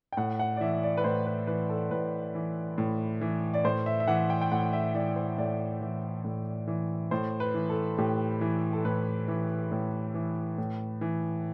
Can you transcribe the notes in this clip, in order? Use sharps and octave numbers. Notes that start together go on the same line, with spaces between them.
G5
A2 F#5
F#5
D5
E3 E5
D5
B4
A2 C5
B4
E3 B4
A4
A2 B4
E3
A2
E3
D5
A2 C5
E5
E5
E3 F#5
G5
G5
A2 F#5
E5
E3 D5
C5
A2 D5
E3
A2
E3
A2 C5
B4
E3
A4
A2 G4
E3
A4
A2 B4
E3
A2
E3
A2
E3